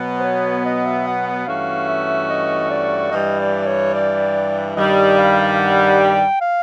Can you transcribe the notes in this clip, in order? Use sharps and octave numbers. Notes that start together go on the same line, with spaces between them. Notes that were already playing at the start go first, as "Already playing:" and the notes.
Already playing: B2 F#3 B3
C5
C#5
D#5
E5
F#5
F#5
G2 E3 A3 C#4 F#4 F5
E5
D#5
D5
G2 E3 G3 D#5
D5
C#5
D5
G2 D#3 G3 D#5
F5
F5
F#5
G5
F5